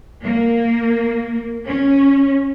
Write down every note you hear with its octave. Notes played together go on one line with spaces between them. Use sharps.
A#3
C#4